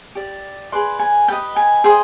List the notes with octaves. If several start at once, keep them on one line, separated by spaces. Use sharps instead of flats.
G4 D5
G#4 B4 D5 C6
G#5
G4 B4 D#5 G5
G#5
G#4 C5 D#5 G5